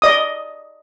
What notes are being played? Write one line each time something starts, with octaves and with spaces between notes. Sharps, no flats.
D5 D#5 D#6